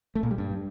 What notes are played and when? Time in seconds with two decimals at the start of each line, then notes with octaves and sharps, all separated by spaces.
0.15 A3
0.23 A#2
0.31 G3
0.38 G2